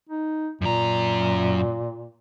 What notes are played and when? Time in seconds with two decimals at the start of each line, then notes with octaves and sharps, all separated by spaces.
0.10 D#4
0.62 F#2 A#2 A#5